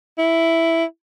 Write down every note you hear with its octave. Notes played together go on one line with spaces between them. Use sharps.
E4